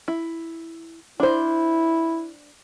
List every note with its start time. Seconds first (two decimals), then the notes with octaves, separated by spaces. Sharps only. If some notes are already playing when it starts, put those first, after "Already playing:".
0.08 E4
1.20 D4 E4 C5